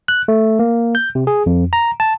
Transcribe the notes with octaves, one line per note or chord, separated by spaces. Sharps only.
F#6
A3
A#3
G6
C3
G#4
F2
A#5
A5